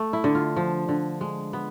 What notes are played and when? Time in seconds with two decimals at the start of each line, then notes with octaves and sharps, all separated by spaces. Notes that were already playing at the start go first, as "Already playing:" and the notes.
Already playing: A3
0.13 E4
0.24 D3
0.35 F4
0.56 F3
0.89 D3
1.21 G#3
1.53 B3